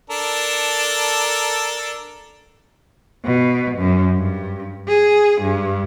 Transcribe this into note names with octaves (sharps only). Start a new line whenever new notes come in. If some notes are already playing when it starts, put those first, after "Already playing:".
D4 A4 A#4
B2
F#2
G2
G#4
G2